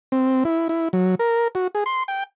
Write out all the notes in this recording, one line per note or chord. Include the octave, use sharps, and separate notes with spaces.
C4
E4
E4
F#3
A#4
F#4
G#4
C6
G5